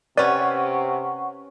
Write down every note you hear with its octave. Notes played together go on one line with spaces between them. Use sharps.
C3 C#4 B4 D5 F#5 C#6